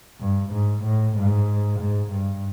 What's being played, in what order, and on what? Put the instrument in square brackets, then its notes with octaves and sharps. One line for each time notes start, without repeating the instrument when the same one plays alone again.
[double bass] G2
G#2
A2
G#2
G#2
G2